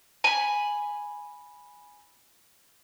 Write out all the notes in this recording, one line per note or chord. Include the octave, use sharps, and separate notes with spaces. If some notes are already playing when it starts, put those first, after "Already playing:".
G#5 B5